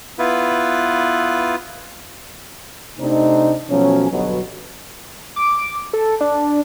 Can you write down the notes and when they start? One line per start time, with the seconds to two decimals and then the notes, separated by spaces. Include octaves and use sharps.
0.19 B3 E4 F4 B4
3.00 C3 A3 C4 D4 D#4
3.70 B2 F3 F#3 A3 C#4
4.11 G1 B2 F#3
5.36 D6
5.93 A4
6.21 D4